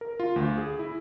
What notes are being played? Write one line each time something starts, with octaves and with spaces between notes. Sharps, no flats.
A#4
F4
D2
G#4
E4